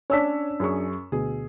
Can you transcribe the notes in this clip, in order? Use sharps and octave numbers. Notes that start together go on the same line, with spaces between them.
C#4 D4 C#5 E6 B6
F#2 G#4 C#6
D2 B2 G#4